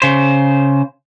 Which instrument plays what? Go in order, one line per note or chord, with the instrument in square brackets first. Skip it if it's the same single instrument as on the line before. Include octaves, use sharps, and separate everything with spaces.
[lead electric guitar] C#3 C5